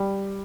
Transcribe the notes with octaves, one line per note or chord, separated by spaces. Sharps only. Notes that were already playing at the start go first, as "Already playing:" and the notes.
Already playing: G3